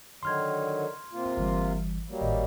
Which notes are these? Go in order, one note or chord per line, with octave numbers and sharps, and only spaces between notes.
D3 D#3 F#3 C6 F6 G#6
C3 A#3 F4
G1 E3 G3
F#3 G3 A#3
G#1 A2 D#5